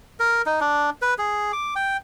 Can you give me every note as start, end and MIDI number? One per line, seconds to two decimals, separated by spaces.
0.20 0.42 70
0.46 0.60 63
0.60 0.90 62
1.02 1.14 71
1.18 1.52 68
1.53 1.74 86
1.76 1.97 79